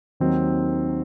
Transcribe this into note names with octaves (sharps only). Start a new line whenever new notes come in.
D#2 D#3 F#3 C4 D#4